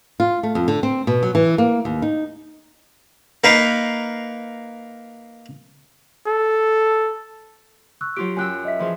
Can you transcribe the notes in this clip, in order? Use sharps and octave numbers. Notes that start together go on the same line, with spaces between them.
F4
A3
F2
D3
C4
B2
F#3
E3
A#3
D#2
D#4
A#3 D#4 B4 F5
A4
C#6 E6 F#6
F#3 F4 G4 D7
F#2 G5 G#5 E6 F#6
D#5 E5 B6
E3 F3 G#4